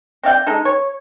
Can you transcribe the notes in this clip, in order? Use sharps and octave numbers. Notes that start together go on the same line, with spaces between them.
C4 D5 F5 G5
G#3 D#4 A4
C#5